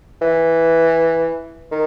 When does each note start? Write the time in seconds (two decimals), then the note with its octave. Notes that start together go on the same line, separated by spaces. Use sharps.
0.22 E3
1.71 D#3